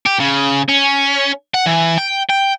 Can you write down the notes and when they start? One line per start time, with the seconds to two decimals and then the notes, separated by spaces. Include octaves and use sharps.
0.06 G4
0.20 C#3
0.69 C#4
1.54 F#5
1.66 E3
1.98 G5
2.30 G5